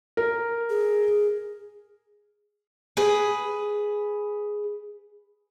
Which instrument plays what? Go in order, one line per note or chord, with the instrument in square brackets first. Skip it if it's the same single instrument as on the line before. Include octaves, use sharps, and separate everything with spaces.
[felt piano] A#4
[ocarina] G#4
[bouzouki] G#4 B4